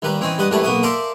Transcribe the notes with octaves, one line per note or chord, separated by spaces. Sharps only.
D#2 G3 B4 A#5
E3 C4 C#4 D#4
G2 B4 D#5 F#5
F#2 E3 G3 A3 B4 A5
B1 A#3 B3 C#6 D#6
A4 A#4 C5 D5 E5 F5